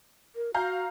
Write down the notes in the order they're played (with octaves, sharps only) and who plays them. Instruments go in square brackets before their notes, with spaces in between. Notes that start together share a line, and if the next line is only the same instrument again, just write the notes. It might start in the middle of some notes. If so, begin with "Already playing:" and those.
[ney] A#4
[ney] F#4 [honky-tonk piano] F5 A#5 G6